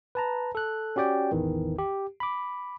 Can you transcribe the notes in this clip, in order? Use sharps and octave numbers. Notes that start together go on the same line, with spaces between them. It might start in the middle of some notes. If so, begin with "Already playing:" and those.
B4 A5 A#5
A4 F#6
C#4 F#4 G4 D5 G5
A1 E2 D#3 E3
G4
B5 D6